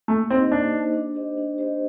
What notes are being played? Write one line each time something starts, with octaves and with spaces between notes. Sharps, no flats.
A3 A#3
C4 D#4 G4 C5 D#5
A#3 D4
D#4 G4 C5 D#5
D4
G4 C5 D#5
D4
G4 C5 D#5